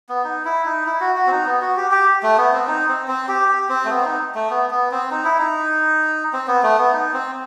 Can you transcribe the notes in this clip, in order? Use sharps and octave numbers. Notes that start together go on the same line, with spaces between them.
B3
D#4
E4
D#4
E4
F#4
F#4
C4
D#4
B3
F#4
G4
G4
A3
B3
C4
D#4
C4
C4
G4
G4
C4
A3
B3
C4
D#4
A3
B3
B3
C4
D#4
E4
D#4
C4
B3
A3
B3
D#4
C4